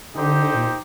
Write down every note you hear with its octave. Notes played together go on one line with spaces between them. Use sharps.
D3 D#4 G4 C5
A#2